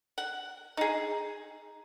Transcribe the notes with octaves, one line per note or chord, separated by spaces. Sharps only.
F#5
D#4 G#4